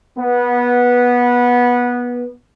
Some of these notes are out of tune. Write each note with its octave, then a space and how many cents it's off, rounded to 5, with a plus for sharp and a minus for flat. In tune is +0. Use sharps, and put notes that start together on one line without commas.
B3 -15